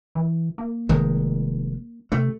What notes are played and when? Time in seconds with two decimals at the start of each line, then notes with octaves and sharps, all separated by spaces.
0.15 E3
0.58 A#3
0.89 F1 D#3 G#3
2.12 C3 A3